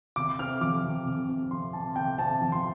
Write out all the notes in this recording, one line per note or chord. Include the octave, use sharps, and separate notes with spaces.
C3 D6
C4 F6
F3 D6
C3
C3
C4
F3 C6
C3 A5
C3 G5
C4 A5
F3
C6